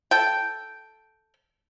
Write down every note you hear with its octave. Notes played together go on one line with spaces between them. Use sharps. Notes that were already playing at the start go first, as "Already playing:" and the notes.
A4 G5